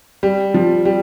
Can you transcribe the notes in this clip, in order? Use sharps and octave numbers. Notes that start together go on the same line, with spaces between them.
G3
F3
G3